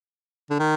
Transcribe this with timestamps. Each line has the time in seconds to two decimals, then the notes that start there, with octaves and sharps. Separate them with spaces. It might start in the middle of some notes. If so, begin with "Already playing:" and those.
0.50 D3
0.59 D#3